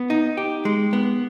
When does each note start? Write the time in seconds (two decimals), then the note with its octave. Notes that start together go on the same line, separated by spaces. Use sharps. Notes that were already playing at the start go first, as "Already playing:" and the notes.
Already playing: B3
0.10 D#4
0.37 G4
0.65 G#3
0.93 B3